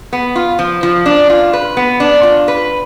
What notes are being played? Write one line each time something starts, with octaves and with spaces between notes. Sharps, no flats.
B3
F4
F3
F3
D4
F4
B4
B3
D4
F4
B4